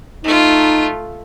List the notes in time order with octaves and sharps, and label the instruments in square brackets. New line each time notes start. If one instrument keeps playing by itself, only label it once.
[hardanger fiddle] A3 F4 [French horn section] D#4